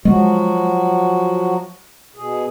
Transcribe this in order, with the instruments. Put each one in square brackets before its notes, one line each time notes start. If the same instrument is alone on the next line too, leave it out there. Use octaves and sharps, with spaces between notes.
[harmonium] F3 F#3 F#4 [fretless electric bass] G#3
[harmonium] B2 G#4